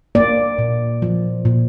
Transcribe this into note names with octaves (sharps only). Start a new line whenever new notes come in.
A#3 D5
A#2
F3
A#2